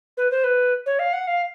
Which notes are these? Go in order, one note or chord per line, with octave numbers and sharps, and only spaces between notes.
B4
C5
B4
C#5
F5
F#5
F5